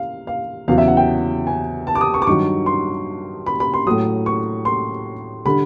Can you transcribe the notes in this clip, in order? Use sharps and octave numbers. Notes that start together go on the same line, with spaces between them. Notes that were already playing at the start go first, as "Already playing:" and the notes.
Already playing: F5
F5
E2 C#3 F#3 F5
E5
F#5
G5
G#5
A5
D6
D#6
C#6
D6
G2 D#3 F#3 C#6
C6
B5
B5
C6
A2 F#3 D#6
C#6
C6
D3 G3 B5